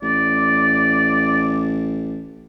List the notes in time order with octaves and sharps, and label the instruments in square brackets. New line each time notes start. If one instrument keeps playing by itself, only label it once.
[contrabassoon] A1 [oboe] D5